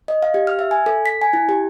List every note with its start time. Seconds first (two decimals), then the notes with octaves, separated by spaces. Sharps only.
0.08 D#5
0.22 F5
0.34 G4
0.47 F6
0.59 E5
0.71 G#5
0.86 A4
1.06 B6
1.21 G#5
1.33 E4
1.49 G4